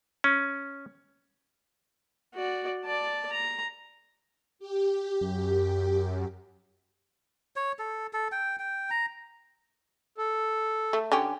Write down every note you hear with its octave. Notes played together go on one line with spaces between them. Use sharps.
C#4
F#4 D5
D5 A5
A#5
G4
F#2
C#5
A4
A4
G5
G5
A#5
A4
A3
D3 C#4 G4